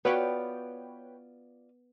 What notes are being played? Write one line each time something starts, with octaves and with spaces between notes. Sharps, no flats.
B3 F4 F#4 B4 C#5 D5 G5